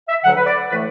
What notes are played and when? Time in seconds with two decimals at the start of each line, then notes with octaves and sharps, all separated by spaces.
0.09 E5
0.24 D2 D3 F#3 F#5
0.37 B4
0.46 D5
0.70 A2 E3 A3 B4